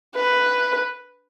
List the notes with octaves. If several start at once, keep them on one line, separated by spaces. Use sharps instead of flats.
B4